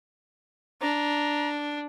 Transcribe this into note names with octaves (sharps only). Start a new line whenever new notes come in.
D4 A#5